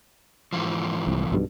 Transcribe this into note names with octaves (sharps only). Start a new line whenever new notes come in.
G#2 E3 F3
C2
B1 G2 B2